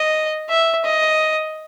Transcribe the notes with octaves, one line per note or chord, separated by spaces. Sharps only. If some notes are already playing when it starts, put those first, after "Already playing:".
Already playing: D#5
E5
D#5